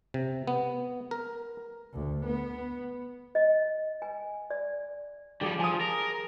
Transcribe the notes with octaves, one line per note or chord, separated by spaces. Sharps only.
C3
B3
A#4
D2
B3
D#5
G#5
D5
F3 G3 G4 G#4
F3 G#5 D#6
A#4